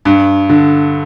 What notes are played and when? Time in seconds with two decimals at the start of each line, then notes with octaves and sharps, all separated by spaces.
0.05 G2
0.49 D3